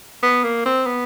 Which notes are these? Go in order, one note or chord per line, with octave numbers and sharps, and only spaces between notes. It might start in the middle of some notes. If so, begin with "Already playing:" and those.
B3
A#3
C4
B3